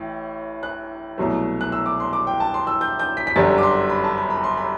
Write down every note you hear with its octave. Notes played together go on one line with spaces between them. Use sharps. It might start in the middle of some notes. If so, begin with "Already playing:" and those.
Already playing: A1 A2
F#6
C2 B2 F#3 A3
F#6
E6
D6
C6
D6
G5
A5
C6
E6
G6
G6
B6
B6
G1 F#2 D3 G3 A6
D6
C6
B5
A5
B5
B5
C6
B5